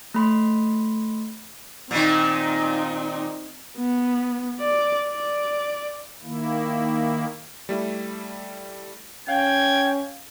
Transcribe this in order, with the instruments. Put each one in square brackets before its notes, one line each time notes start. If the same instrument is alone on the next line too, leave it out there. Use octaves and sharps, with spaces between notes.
[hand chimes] A3 B5 C6
[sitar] A#2 D#3 [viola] C4 D#4
[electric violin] B3
D5
D5
[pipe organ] D#3 A#3 E4
[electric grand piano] G3 A3 E4
[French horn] C#4 [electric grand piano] F5 [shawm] G5 [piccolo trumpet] G#6